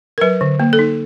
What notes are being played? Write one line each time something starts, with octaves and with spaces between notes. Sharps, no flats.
A#4
F#3 B4
D3
A#3
A4
D#4